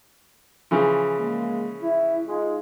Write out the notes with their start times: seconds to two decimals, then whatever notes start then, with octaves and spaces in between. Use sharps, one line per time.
0.71 C#3 E3 F3
1.18 G#3 A#3
1.82 E4
2.27 G#3 D#4 F4